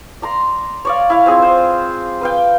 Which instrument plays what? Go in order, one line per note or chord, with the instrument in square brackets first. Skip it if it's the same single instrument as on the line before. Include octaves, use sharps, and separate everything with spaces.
[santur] D5 A#5 C6
C#5 D5 F5
E4 F5
C4 F4 G#4
C5
B4 F5 G5